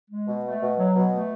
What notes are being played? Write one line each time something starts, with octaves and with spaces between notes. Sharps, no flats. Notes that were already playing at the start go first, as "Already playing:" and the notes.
G#3
B2
A3
B2
F#3
B2
A3